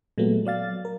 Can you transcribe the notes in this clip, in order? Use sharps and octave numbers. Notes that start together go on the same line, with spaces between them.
A#2 F#3 G#3 A3 B3
F#3 D5 F5 A6
A#4